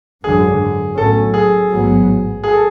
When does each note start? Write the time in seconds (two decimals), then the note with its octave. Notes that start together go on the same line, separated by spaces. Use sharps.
0.24 G#1 F#2 D3 F#3 G#4
0.97 B1 A2 F#3 C#4 A4
1.34 G#4
1.70 A1 G#2 F#3 B3
2.44 G#4
2.53 A4